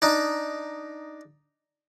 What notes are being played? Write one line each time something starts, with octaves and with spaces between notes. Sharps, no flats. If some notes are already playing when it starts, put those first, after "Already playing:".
D4 D#4